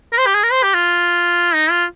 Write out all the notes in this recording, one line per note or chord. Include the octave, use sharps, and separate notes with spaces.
A#4
C5
G4
G#4
A#4
C5
G4
F4
D#4
F4